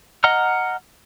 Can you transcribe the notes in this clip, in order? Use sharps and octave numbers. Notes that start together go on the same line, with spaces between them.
D#5 F#5 A#5 F6